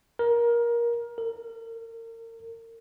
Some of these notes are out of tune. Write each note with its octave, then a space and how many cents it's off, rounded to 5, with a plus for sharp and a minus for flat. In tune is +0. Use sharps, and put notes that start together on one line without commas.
A#4 +20
A#4 -35